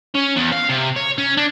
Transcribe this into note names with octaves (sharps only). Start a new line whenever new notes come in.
C#4
E2
F5
C3
C#5
C#4
D4